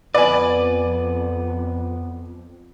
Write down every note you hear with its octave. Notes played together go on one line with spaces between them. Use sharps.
F2 B3 B4 D5 G#5